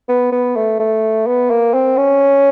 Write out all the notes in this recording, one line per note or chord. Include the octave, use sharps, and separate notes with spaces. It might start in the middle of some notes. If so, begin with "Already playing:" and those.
B3
B3
A3
A3
B3
A#3
C4
C#4